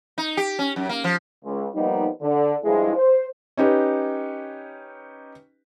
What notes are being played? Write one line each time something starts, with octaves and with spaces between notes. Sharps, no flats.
D#4
G4
C#4
F#2
A#3
F3
C#2
F3 G3 A#3 B3 D#4
D3
G2 F3 G#3 E4
C5
C#4 D#4 G4 B4